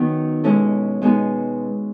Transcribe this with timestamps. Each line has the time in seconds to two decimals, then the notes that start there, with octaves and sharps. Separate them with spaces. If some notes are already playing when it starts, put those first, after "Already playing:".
Already playing: D#3 F#3 B3 C#4
0.44 B2 G#3 C#4 E4 A4
1.02 B2 G#3 B3 D#4 G#4